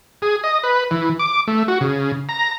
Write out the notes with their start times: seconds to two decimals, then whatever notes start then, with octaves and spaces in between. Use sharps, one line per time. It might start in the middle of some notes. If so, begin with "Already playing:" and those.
0.22 G#4
0.44 D#5
0.64 B4
0.91 E3
1.19 D6
1.47 A3
1.68 F#4
1.81 C#3
2.29 A#5